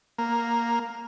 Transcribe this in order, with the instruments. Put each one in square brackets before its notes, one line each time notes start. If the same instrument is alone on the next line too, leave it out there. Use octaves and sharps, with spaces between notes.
[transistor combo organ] A#3